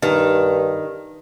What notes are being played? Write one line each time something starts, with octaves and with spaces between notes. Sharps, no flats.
G2 D#3